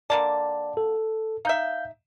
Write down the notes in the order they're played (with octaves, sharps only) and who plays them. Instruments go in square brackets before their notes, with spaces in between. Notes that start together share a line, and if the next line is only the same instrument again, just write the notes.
[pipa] D3 A#3 A5 [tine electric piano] D5
[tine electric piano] A4
[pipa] D#4 E5 [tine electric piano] F5 G6